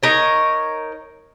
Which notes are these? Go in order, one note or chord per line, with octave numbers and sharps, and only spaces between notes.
D#4 A#4 C#5